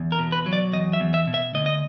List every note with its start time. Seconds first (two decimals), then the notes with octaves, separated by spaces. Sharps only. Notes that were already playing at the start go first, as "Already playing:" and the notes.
Already playing: E2
0.12 A#4
0.19 B2
0.32 B4
0.46 F#3
0.53 D5
0.73 E2 D#5
0.93 E5
1.00 E2
1.14 E5
1.27 B2
1.34 E5
1.54 D2 D#5
1.66 D#5